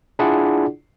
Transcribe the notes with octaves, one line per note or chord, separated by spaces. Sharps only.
D4 E4 F4 G#4 D5 F#5